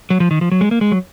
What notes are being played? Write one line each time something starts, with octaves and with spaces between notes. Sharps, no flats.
F#3
F3
D#3
F3
F#3
G#3
A#3
G#3
F#3